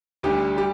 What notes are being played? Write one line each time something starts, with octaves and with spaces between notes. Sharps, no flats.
D2 D3 G3 G4
G3 G4